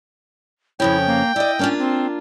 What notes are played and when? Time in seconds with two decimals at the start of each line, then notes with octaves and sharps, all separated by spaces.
0.80 F2 C#3 C#4 E4 G5
1.06 A#3
1.36 E4 D5 D#5
1.59 A#3 C#4 D4 F4
1.79 C4